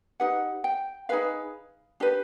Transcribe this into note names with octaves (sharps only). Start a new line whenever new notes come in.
D#4 G4 B4 F#5
G5
D#4 G#4 B4 F5
D4 G4 B4